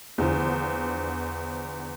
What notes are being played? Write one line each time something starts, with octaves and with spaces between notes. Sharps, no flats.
E2 D3 F3